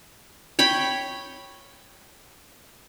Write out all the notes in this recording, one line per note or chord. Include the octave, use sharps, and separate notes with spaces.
C#5 G5 B5